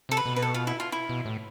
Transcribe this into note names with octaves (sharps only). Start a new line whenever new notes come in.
C3 A4
B4
B2
B4
A4
F4
E4
F4
E4
B2
A2